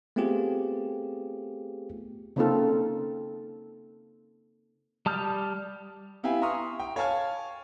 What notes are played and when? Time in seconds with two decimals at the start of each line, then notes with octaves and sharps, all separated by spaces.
0.16 A3 B3 C4 F4 G4 G#4
2.36 C#3 A#3 C4 D#4 F4 A4
5.06 G3 A5 D#6 F6 G6
6.23 B3 E4 G4 F5 G5 G#5
6.41 E5 A#5 C6 C#6 D#6 F6
6.79 G5
6.96 C#5 F5 G#5 A5 F6 G#6